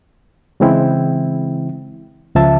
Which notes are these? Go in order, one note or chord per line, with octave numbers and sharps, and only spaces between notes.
C#3 E3 G#3 C4 E4 G5
C#2 C#3 F3 E5 A5